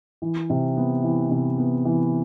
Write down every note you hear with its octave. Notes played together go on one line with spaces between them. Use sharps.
E3
C3
B3
E3
C3
B3
E3